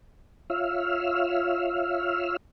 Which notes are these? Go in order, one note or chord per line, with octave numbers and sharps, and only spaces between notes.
F4 C#5 E5 F5 E6 F6